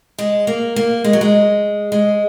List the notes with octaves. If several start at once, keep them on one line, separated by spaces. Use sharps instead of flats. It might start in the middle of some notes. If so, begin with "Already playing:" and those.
G#3
A#3
A#3
G#3
F#3
G#3
G#3